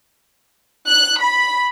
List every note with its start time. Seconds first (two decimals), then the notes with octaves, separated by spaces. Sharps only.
0.87 F#6
1.20 B5